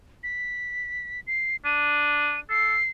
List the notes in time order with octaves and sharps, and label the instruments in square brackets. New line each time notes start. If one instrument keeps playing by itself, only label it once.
[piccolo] B6
C7
[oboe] D4 [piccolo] D#7
[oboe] A4 [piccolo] C7